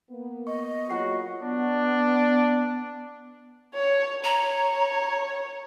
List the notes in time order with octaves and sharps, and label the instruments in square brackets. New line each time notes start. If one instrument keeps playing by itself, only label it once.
[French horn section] A#3 B3
[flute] D#5 [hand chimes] C#6
[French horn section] F#3 A#3 G#4 [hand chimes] F4 F#5 C7 [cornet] F#4
[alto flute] B3 [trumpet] D4
[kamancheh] C#5
[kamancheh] C#5 [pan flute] A#5